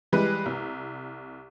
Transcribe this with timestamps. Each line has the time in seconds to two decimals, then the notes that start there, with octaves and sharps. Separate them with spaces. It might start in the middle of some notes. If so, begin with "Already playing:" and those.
0.12 E3 G3 G#3 B4
0.46 C2